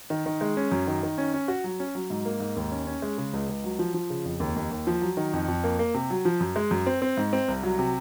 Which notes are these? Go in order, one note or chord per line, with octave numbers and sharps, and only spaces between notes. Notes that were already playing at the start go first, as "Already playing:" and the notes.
D#3
D#3
G#3
C#4
F#2
D#3
D#3
C#4
C#4
F#4
F#3
C#4
F#3
G#2
A#3
G#2
D#2
C#4
C#4
G#3
C#3
C#2
C#2
F#3
F3
F3
C#3
F2
D#2
D#2
D#2
F3
F#3
D#3
F2
F2
A#3
A#3
C3
F#3
F3
F#2
G#3
F#2
C4
C4
G#2
C4
C2
F#3
C3